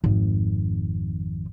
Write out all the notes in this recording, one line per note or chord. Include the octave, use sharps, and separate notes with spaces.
G#1 F2